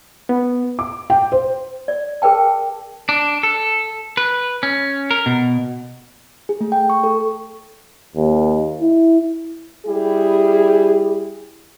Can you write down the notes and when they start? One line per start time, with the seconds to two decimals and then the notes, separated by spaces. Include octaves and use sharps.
0.29 B3
0.79 D6
1.10 G5
1.32 C5
1.88 D5
2.22 G#4 A#4 B4 G5 A5
3.09 D4
3.43 A4
4.17 B4
4.63 C#4
5.11 A#4
5.26 B2
6.49 G#4
6.61 A3
6.72 G5
6.90 C#6
7.04 A4
8.16 D#2
8.81 E4
9.86 G3 E4 G4 G#4